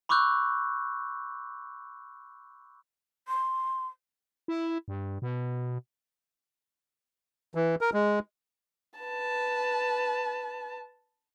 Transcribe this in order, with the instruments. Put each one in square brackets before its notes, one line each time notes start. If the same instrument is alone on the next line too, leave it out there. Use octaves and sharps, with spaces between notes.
[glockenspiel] B5 C#6 D6 E6 F#6 G6
[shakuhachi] C6
[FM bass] E4
G2
B2
[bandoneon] E3
A#4
G#3
[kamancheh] B4 A5